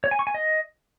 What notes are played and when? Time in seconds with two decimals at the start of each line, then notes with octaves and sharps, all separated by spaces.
0.04 C#5
0.11 G#5
0.19 C#6
0.27 G#5
0.34 D#5